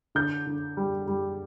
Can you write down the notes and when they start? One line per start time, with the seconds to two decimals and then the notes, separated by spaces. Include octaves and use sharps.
0.15 D3 G6
0.47 D3
0.77 G3
1.07 G3